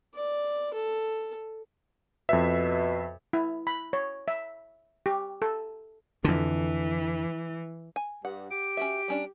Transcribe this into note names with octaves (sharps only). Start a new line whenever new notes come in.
D5
A4
F2 B2 E5
E4
B5
C#5
E5
G4
A4
F2 D3 E3
G#5
G2 F#5
G4 D7
C#4 F#4 E5
G3 C#4 D4